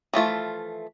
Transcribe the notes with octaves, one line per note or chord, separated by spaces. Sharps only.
E3 F3 A3 F4